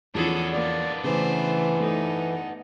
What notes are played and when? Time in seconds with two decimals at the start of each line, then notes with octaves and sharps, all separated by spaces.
0.15 E2 F3 B3 C#4 D4 G#4 A4
0.53 A#3 D5
1.04 C#3 E3 A3 C5
1.80 A3 D#4